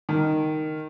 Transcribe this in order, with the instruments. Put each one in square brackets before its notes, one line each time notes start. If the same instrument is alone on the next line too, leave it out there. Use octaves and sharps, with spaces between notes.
[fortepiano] D#3